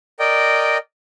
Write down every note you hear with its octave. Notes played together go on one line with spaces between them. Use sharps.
A#4 D5 D#5 G5